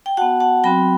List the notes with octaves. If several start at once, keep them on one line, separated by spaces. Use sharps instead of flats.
G5
B3 F#4 F#5 A5
F#5 A5
F#3 C4 F#4 G5 B5